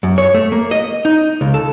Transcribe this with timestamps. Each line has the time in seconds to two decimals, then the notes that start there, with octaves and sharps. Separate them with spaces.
0.03 F#2
0.18 C#5
0.34 A3
0.52 A#3
0.71 D#5
1.05 D#4
1.41 C#2
1.54 A4